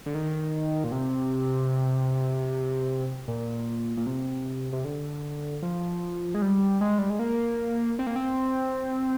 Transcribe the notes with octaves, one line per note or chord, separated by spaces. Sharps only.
D3
D#3
A#2
C3
A#2
A#2
C3
C3
D3
F3
G#3
G3
G#3
G3
G#3
A#3
C4
A#3
C4